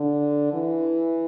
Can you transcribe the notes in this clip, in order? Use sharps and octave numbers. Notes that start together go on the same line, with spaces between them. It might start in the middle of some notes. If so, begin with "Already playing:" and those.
Already playing: D3
E3